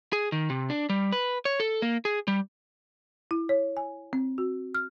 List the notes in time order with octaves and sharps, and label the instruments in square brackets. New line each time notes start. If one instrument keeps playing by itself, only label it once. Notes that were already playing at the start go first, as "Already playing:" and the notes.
[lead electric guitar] G#4
D#3
C3
D4
G3
B4
C#5
A4
A#3
G#4
G3
[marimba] E4
C#5
G#5
C4
F#4
F6